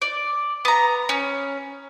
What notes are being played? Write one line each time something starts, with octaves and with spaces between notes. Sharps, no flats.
D5
B3 A#5
C#4